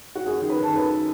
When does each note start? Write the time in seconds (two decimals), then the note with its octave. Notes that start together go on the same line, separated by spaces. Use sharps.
0.15 F#4
0.26 F#2 G#4
0.41 D#3
0.50 B4
0.58 D#3 A4
0.74 F#2 B4